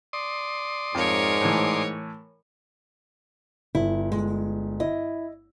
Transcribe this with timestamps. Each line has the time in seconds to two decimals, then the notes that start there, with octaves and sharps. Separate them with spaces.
0.13 D5 C6 D#6
0.95 F2 G#2 A#4 C#5
1.41 A2 E3
3.75 G1 E4
4.12 G#3
4.80 E4 D#5